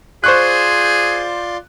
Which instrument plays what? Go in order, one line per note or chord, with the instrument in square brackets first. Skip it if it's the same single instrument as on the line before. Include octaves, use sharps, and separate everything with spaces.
[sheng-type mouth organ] F4 D5 C6 [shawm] G#4 [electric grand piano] C5 C#6 F#6